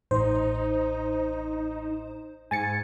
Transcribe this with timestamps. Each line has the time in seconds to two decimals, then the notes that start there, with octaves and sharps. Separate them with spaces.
0.11 A1 D#4 C5
2.51 G#2 G#5 A6 C#7